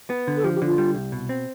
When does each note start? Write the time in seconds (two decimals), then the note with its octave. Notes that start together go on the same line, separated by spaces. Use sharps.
0.10 B3
0.27 D3
0.37 A4
0.44 F3 G4
0.55 G4
0.62 D3 F4
0.78 G3
0.95 C2
1.12 B2
1.29 C4